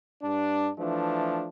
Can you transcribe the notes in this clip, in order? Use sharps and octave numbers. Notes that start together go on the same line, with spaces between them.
G2 D4
E3 F3 A3 D4